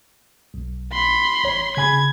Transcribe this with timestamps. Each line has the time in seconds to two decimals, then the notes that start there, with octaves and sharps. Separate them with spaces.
0.54 B1
0.93 B5 C6
1.44 A1 C#5
1.77 C#3 G#5 B5 G#6